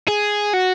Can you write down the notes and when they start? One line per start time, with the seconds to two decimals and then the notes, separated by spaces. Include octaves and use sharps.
0.08 G#4
0.54 F#4